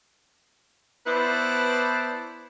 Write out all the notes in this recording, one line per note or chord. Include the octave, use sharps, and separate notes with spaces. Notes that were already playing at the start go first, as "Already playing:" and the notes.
B3 E4 B4 C5 D5 A5